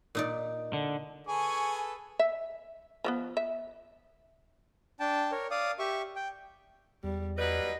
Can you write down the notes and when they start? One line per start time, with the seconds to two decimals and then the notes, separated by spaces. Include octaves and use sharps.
0.15 A#2 D#4 D5
0.73 D3
1.28 G#4 A4 B4 G#5 C#6
2.19 E5
3.04 F3 A3 B3
3.37 E5
5.00 D4 G5 A5
5.32 A#4 C#5
5.51 D5 F5 D#6
5.79 G4 E5 C#6
6.16 G5
7.04 E2 G3
7.38 F#3 G3 B4 D#5